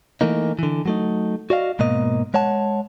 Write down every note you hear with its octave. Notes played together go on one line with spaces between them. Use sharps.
E3 A3 A#3 D#4
D3 E3
F#3 A3 D#4
F#4 D5 D#5 F5
G#2 B2 A#3 D#5
G#3 C#5 F#5 A5